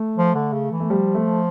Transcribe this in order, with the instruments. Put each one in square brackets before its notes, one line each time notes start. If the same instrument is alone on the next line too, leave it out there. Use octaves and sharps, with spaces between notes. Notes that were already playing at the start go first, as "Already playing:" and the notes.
Already playing: [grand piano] A3
[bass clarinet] F3
D3
C#3
E3
[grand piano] A3
[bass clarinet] F3 [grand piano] G3
[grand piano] A3